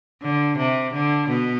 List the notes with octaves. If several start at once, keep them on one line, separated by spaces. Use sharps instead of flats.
D3
C3
D3
B2 B3